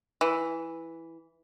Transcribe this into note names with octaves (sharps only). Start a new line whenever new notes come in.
E3